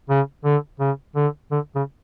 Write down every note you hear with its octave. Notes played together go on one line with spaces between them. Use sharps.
C#3
D3
C#3
D3
D3
C#3